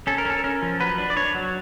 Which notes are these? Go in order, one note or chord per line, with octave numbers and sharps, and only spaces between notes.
C#4 A4
A#4
C#4 A4
C#4 A#4
F3
F#3 B4
D4
D5
D4 C#5
F#3